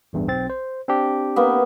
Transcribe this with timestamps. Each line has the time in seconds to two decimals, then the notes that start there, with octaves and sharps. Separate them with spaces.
0.13 A1 E2 G2
0.28 B1 C4 A6
0.50 C5
0.88 C4 D4 G4
1.36 A#3 B3